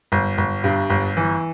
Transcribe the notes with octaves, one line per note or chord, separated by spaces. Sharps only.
G1
G1
G2
G1
E3